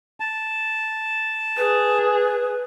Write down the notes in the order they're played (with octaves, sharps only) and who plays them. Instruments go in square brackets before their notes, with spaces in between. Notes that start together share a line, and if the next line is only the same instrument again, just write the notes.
[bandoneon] A5
[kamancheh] G#4 [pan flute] B4